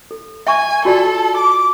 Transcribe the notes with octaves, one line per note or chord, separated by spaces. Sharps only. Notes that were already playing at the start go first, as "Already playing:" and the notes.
A4
E5 G#5 C#6
F4 F#4 A4 D5
D6